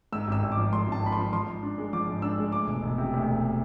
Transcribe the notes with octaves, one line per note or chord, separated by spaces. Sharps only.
G#2 E6
G#1 E6
G#1
D6
F3
G#2 C6
G#1
A5
G#1 B5
C6
F3
F3 C6
G#2
D4
G#3
F3 D6
G#2
D4 E6
G#3
D2 D6
E1
E1
C3
D2
E1